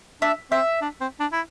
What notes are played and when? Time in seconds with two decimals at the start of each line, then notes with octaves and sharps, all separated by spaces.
0.22 D4 E5
0.51 C4 E5
0.81 D4
1.01 C4
1.20 D4
1.32 E4